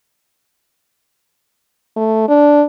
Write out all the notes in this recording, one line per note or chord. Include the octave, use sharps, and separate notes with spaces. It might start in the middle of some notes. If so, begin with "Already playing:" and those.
A3
D4